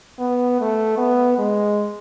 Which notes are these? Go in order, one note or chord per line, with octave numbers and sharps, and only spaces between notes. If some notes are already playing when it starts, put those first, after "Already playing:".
B3
A3
B3
G#3